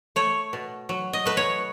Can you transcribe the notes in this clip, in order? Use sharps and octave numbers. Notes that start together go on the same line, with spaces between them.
A3 C#5
B2
F#3
D#5
A3 B4
C#5